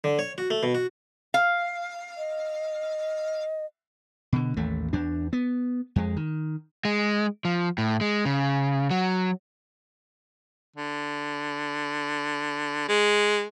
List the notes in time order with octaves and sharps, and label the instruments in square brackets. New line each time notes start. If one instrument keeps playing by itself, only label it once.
[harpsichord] D3
C#5
F#4
A3
B2
F#4
[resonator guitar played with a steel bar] F5
[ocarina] D#5
[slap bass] B2 D3
A1 D#2 A3
E2 D4
B3
F2 G#3
D#3
[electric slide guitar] G#3
F3
A2
G#3
C#3
F#3
[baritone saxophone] D3
G#3